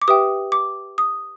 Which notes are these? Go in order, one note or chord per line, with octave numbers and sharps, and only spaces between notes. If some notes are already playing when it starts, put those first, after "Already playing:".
D6
G4 B4 E5 G5 D#6
D6
D#6